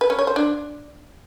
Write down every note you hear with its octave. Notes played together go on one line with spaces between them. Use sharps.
B4
C#4
C#5
C5
D4